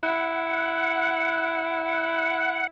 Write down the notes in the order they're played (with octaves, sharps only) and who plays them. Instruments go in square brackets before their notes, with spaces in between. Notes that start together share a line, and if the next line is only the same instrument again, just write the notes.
[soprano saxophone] E4 [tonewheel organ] F#5